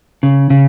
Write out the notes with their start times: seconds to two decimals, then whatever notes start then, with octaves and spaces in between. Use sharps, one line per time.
0.23 C#3
0.50 C#3